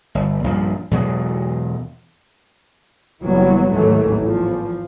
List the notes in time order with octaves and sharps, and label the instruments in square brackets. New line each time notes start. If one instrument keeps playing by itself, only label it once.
[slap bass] G1
A#1 G2 F3
E2 B2 F#3 G#3
[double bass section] F#1 E3 F#3 G3 B3
A1 D#2 G#2 E3 F#3 A3
E2 F3